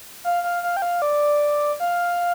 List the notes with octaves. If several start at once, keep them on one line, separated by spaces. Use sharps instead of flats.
F5
F5
F5
G5
F5
D5
F5